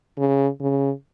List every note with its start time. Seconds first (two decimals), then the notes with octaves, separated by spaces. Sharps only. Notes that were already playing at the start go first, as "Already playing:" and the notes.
0.18 C#3
0.60 C#3